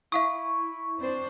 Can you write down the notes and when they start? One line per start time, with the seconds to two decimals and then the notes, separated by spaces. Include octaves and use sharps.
0.12 E4 E5 F5 C#6 D#6
0.97 C4 D4 C5